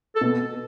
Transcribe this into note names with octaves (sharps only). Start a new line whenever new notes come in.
A4
B2